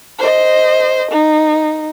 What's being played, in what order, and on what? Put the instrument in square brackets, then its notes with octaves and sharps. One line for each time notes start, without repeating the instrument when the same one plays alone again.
[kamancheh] C5 D#5
D#4